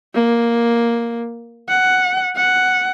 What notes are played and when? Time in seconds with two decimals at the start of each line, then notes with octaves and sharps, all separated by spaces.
0.14 A#3
1.69 F#5
2.36 F#5